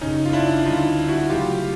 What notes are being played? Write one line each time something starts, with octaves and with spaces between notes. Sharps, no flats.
G#1 F#2 C#3 C#4 D#4
F4
D4 E4
D2 D3 G3 D#4 F4
E4 F#4
C#3 F#3 A3 F4 G4